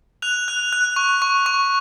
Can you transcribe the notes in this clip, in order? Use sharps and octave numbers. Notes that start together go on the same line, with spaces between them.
F#6 F7
F#6
F#6
C#6
C#6
C#6